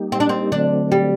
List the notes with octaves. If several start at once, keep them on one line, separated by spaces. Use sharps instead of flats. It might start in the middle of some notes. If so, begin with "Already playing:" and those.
Already playing: G3 A#3 D#4 G4
C4
D4
C4
D3 F#3 A3 C4 D4
G3